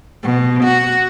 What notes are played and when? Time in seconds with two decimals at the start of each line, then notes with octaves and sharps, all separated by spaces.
0.23 B2
0.64 F#4